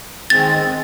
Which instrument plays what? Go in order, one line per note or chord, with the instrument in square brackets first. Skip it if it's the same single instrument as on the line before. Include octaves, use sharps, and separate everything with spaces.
[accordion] D#3 G#3 C4 [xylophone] A6